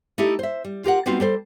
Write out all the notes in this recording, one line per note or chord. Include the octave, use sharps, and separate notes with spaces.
A3 D#4 E4 G4 A4
C5 E5
G3
F4 G4 A#4 F#5
G3 B3 C4 D#4 F4 F#4
G3 A4 C5